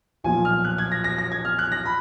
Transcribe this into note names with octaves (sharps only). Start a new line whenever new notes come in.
B1 A#2 F3 G#5
F6
F#6
G#6
A#6
A#6
A#6
G#6
F6
F#6
A#6
B5